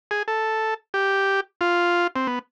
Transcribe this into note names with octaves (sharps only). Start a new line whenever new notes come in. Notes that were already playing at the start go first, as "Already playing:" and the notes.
G#4
A4
G4
F4
C4
B3